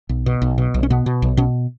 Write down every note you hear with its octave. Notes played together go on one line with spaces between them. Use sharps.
B1
B2
B1
B2
B1
C#4
B2 B3
B2
B1
B2 C#4